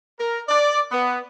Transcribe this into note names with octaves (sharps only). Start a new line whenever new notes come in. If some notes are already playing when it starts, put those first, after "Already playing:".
A#4
D5
B3